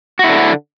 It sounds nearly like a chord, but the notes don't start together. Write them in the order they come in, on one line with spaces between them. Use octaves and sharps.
F#4 E4 D3